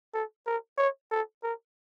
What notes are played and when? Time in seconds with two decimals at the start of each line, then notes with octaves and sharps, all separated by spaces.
0.14 A4
0.46 A#4
0.78 C#5
1.11 A4
1.43 A#4